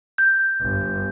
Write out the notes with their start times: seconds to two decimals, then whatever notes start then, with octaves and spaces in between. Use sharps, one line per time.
0.18 G6
0.61 G1